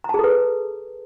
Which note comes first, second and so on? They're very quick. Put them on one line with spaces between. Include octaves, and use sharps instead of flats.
A#5 A5 G#4 A4 B4